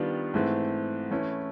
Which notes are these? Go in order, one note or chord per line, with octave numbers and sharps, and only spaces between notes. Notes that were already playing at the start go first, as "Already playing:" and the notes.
Already playing: D#3 G3 B3 D4 F4
G#2 E3 A3 C4
E3 A3 C#4 E4